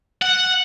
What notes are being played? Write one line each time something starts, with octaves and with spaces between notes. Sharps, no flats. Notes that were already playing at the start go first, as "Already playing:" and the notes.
F#5